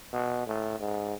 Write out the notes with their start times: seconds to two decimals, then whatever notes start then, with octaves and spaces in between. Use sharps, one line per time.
0.13 B2
0.46 A2
0.79 G#2